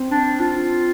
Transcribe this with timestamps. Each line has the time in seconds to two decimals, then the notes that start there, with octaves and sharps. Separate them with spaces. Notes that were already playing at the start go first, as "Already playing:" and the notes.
Already playing: C4
0.11 D4
0.40 F4